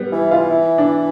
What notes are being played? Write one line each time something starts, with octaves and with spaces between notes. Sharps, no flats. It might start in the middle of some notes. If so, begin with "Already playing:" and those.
Already playing: G3 B3
E3 E4
E3 F4
E4
D4